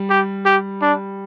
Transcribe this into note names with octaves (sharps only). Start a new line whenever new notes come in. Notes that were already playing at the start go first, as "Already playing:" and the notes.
Already playing: G3
G4
G4
D4